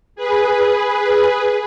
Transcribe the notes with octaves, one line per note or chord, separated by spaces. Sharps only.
G#4 B4